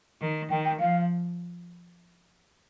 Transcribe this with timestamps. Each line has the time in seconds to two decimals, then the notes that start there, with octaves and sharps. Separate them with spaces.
0.21 D#3
0.50 D#3 G5
0.65 G5
0.80 F3 F5